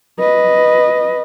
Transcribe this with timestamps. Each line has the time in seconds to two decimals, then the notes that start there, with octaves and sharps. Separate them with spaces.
0.19 B4 D#5